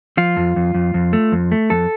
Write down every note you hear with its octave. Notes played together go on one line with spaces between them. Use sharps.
F3 F4
F2
F2
F2
F2
A3
F2
A3
F2 A4